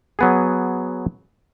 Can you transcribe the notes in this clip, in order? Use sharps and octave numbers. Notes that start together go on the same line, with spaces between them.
F#3 B3 G#4